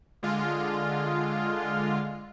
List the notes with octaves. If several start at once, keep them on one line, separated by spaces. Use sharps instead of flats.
D3 G#3 F4